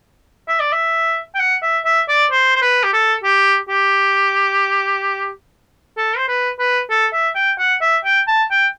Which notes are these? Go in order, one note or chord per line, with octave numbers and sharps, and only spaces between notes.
E5
D5
E5
G5
F#5
E5
E5
D5
C5
C5
B4
G4
A4
G4
G4
A4
C5
B4
B4
A4
E5
G5
F#5
E5
G5
A5
G5